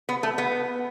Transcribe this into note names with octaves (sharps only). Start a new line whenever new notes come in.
B3
A3
B3